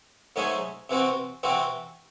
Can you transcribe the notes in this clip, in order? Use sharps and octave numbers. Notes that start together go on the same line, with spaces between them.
G#2 F#3 A3 C#4 G#4
C3 E3 C4 F#4
C3 E3 C4 F#4